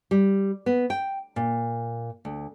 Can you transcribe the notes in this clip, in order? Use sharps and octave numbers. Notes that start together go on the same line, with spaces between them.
G3
B3
G5
A#2
D2